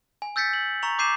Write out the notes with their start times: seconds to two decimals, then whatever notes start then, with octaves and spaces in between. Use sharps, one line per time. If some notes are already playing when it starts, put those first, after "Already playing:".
0.22 G#5
0.36 E6 G6 A6 B6 C#7
0.53 F#7
0.83 A#5 C#6 F7
0.99 D6 G6 C7 D#7 E7